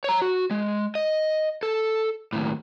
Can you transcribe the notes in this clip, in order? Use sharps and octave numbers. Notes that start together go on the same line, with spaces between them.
C#5 A#5
F#4
G#3
D#5
A4
D#2 A2